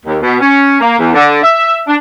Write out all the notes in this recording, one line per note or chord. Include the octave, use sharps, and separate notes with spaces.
D#2
B2
C#4
A#3
E2
D3
E5
D4